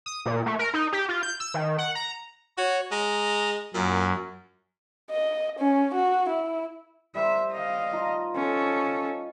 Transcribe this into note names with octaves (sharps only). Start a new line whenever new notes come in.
D#6
A#2
A3
A#4
D#4
G4
F4
G6
E6
D#3
F#5
A#5
F#4 C#5
G#3 A#5
F#2 A#2
D#5
C#4
F#4
E4
G3 A#4 C5 E5
D#5 F5
D#4 F4 A5
C#4 A4